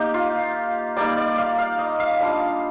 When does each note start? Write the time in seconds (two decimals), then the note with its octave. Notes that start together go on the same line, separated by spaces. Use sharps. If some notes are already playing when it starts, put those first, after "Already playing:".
Already playing: A#3 D#4 G4
0.14 F4
0.96 G3 A#3 D#4 D5
1.17 D5
1.38 F5
1.58 F5
1.79 D#5
2.00 F5
2.20 G3 D4 F4 D#5